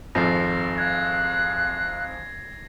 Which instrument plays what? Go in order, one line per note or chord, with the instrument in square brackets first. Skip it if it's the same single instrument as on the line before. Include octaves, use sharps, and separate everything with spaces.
[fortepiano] G#1 F2 F3 [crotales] A#6 C7
[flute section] F5 F#6 [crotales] G#6